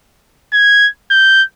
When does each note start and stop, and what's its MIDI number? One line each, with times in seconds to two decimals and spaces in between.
0.53 0.88 92
1.11 1.43 91